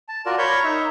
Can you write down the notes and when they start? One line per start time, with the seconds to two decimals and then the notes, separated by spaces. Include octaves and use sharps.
0.09 A5
0.26 F4 F#4 A#4 D5 A5
0.38 A#4 C#5 B5 C#6 G6
0.64 D#4 E5